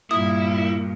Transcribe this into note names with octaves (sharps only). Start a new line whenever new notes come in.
G2 A#2 E4 D#6